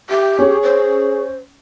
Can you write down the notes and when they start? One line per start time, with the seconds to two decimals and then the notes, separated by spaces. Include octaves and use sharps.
0.10 G4 E5
0.39 C#4 G#4 C#5
0.63 C5